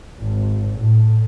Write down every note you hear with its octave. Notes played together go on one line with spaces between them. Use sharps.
G#1
A2